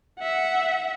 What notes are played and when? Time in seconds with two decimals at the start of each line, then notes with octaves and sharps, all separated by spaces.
0.19 E5 F#5